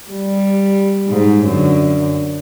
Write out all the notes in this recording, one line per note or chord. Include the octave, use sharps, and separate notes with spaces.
G3
G#2
F#2 D3